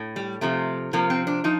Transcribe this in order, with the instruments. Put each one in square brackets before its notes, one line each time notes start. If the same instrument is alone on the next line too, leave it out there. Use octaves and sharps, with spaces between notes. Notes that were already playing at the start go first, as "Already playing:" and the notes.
Already playing: [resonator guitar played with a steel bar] A2
G3
C3 F3 A3
C3 F3 A#3
C4
D4
F3 D#4